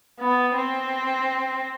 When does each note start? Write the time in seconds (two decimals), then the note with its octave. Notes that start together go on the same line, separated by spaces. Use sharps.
0.20 B3
0.56 C4